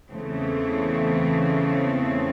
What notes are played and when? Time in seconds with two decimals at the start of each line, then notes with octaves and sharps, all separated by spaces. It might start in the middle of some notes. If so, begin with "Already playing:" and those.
0.11 E2 C#3 E3 A3 C4